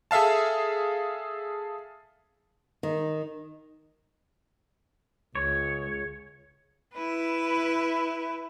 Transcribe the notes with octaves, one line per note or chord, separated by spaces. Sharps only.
G#4 A4 E5 F5 A5
D#3
C#2 C#5
E4 B4